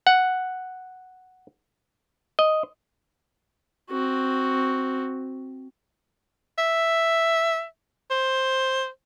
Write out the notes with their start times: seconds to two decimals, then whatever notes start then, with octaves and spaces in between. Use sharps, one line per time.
0.07 F#5
2.39 D#5
3.90 C4 F#4
6.58 E5
8.11 C5